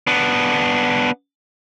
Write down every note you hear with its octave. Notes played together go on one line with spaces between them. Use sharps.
B3 D4